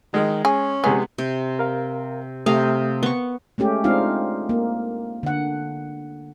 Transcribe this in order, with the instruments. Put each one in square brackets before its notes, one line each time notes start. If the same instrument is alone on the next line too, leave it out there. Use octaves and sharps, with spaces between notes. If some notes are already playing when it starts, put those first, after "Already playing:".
[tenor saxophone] D#3 [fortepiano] G#3
[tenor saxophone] C#4 [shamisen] G#4
[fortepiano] C3 G#3 B3 [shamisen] G#4
[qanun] C3
[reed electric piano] A#4 F5
[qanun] C3 F5 A#5 [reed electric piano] A3 G4 D#6
[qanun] B3 C#6
[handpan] G#3 A3 C#4 G4
G#3 C4 D4 D#4 F4 F5
A#3
D3 F#5